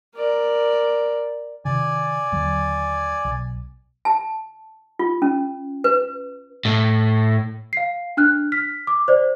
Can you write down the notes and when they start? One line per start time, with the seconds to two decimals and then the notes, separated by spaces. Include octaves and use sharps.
0.15 A#4 D5
1.65 C3 D#3 D5 G#5
2.32 D#2 D3 F#3
3.25 B1
4.05 A5
4.99 F4
5.22 C#4
5.84 B4
6.65 A2
7.73 F5 C7
8.17 D4 F6 F#6
8.52 F6 B6
8.87 D6
9.08 C5 D5